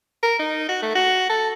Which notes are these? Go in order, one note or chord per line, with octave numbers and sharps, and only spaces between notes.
A#4
D#4
F#4
A3
F#4
A4